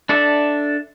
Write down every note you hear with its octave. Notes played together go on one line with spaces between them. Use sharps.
D4 A4 D5 E5